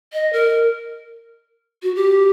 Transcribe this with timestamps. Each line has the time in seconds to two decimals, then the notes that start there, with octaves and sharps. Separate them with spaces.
0.13 D#5
0.33 A#4
1.83 F#4
1.95 G4